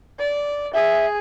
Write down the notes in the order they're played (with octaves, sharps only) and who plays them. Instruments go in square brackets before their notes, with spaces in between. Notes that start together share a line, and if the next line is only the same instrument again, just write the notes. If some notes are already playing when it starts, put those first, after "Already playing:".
[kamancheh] D5
[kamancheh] G#4 [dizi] E5